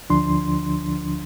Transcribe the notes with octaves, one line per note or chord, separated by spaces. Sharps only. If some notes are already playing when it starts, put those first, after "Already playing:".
D2 D3 F3 D4 C6